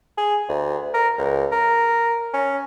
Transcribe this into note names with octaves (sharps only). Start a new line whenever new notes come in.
G#4
D2
A#4
C#2
A#4
C#4